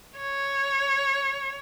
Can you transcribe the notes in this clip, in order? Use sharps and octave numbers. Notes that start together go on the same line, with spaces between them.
C#5